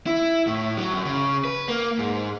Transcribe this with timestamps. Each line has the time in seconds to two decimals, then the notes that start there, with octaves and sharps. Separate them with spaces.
0.06 E4
0.47 A2
0.77 F#3
0.92 F#2
1.05 C#3
1.45 B4
1.68 A#3
1.99 G#2